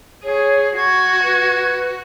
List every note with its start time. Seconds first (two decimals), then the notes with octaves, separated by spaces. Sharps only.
0.24 G#4 C#5
0.76 F#4 C#6 G#6
1.23 B4